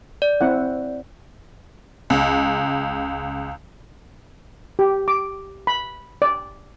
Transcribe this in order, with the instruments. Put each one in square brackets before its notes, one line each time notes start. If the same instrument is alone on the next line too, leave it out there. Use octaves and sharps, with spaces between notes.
[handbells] D5
[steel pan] C4 E4 F#5
[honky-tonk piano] C#2
[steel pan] G4
D6
B5
D5